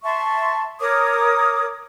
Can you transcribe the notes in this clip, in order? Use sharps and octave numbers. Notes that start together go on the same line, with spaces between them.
E5 A5 C6 C#6
A#4 C#5 D6 D#6